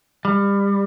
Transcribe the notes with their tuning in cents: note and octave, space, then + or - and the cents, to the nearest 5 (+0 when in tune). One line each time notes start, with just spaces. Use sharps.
G3 +30